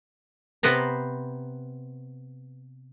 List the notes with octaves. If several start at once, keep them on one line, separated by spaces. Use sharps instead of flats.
C3 B3 B4 C5 A#5